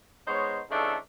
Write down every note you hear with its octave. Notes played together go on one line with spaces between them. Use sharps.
G#3 B3 D#4 C5 C#5
C#3 E3 A3 D4 D#4 A4